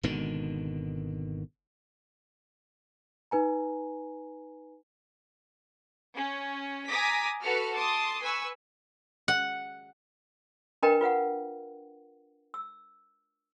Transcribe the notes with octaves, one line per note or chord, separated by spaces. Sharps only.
G#1 B2 D3 D#3
D#4 B4 G#5 A#5
C#4
G#5 A#5 D6 D#6 A#6 B6
F#4 A4 B4 F6 C#7
A5 C6 D6 D#6
B4 G#5 C#6 E6
F#5
D4 A#4 B4 D#5 G5 A#5
F4 B4 F5 F#5
E6